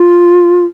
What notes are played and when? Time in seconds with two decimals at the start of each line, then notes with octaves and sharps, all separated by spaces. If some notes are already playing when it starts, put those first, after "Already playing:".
Already playing: F4